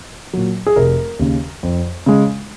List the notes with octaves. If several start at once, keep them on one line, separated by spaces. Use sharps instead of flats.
A#2 F#3
G#4
F1 A#4
D#2 C#3
F2
C#3 G#3